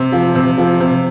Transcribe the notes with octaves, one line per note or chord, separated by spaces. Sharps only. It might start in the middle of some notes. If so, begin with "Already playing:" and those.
Already playing: C3
F3
C3
F3
C3